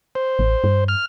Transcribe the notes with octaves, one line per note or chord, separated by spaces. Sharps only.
C5
A1
G2
F6